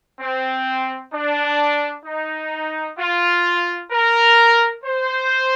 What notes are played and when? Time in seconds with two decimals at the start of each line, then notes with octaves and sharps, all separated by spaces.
0.20 C4
1.13 D4
2.05 D#4
2.98 F4
3.92 A#4
4.84 C5